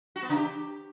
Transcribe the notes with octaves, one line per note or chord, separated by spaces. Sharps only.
F#4
B3
C#3
G4